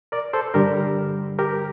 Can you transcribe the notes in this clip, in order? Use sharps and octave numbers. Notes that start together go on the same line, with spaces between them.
A#4 D5
A4 C5
G2 D3 G3 G4 A#4
G4 A#4